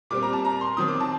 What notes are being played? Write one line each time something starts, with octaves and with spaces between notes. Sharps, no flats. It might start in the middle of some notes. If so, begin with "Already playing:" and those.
A#2 G3 C4 D6
A#5
A5
A#5
C6
D#3 F#3 C4 D#6
D6
A5